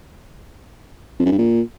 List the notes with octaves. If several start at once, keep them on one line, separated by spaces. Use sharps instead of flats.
F2
F#2
G2
A#2